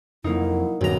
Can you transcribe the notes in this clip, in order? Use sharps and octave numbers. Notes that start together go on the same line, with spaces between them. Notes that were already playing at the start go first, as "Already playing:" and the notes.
F2 F#3 A#3 D#4 E4
D#1 B1 G2 A#5